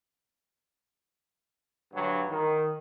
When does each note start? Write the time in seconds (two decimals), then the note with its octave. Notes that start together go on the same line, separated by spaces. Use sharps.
1.93 D2 G2 F#3
2.30 D#3